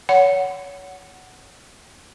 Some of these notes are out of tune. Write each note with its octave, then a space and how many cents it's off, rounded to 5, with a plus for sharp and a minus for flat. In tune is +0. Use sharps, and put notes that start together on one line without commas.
C#5 +25 F#5 +0